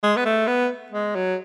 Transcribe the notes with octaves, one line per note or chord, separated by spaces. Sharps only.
G#3
B3
A3
B3
G#3
F#3